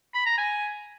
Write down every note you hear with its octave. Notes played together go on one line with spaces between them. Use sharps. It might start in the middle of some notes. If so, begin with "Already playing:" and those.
B5
A#5
G#5